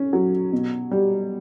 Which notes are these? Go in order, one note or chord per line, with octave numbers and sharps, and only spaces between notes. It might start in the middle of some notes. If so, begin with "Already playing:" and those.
Already playing: C#4
F#3
B2
G3